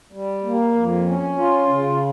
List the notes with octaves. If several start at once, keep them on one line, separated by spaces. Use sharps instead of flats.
G3
A#3
F2
C#4
F4
C#3